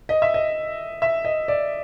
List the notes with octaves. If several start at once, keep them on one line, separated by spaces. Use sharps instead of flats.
D#5
E5
D#5
E5
D#5
D5